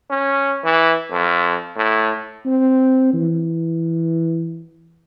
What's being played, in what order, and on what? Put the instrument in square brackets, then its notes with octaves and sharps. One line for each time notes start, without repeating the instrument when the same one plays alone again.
[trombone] C#4
E3
F2
A2
[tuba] C4
E3